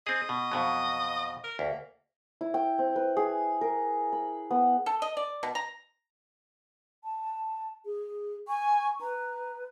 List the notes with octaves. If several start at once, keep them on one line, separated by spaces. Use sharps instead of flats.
C4 G#4 D#5
B2
F2 B2 F#3
A#4
D2 A#3
E4
G5
C4
B4
G#4
A#4
B5
B3
A4
D#5
D5
B2
A#5
A5
G#4
G#5 C#6
B4 A#5